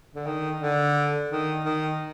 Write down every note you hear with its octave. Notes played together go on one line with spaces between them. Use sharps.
D3
D#3
D3
D#3
D#3